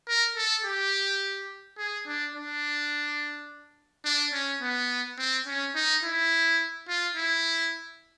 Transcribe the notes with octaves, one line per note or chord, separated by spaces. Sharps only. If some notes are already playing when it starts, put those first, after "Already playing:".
A#4
A4
G4
G#4
D4
D4
D4
C#4
B3
C4
C#4
D#4
E4
F4
E4